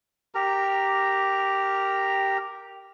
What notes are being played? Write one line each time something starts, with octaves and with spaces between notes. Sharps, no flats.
G4 A#4 A#5